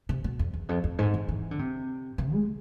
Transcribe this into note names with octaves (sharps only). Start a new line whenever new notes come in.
C3
B2
F2
E2
F2
F2
G#2
E3
E3
D3
C3
C3
G#3